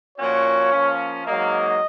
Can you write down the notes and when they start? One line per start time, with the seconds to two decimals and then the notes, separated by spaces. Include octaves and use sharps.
0.18 A#2 F3 A#3 C#4 F#4 C#5
0.72 F3 A#3 C#4
1.26 G#2 F#3 A#3 D#5